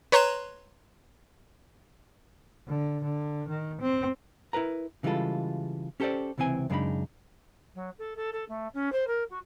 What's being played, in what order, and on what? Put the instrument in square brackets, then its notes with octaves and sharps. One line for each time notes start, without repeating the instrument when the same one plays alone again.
[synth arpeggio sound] B4 C#5 A#5 C6 F#6 E7
[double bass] D3
D3
D#3
C4
[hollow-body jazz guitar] E4 A#4 B4 A#5
C#3 E3 G3 G#3 F4 A4
C#4 G4 A4 A#4 C5 D5
C#2 C3 E3 C4 G#5
F#2 C#3 G#3 D4 D#4 B5
[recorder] F#3
A4
A4
A4
A3
C#4
C5
A#4
F#4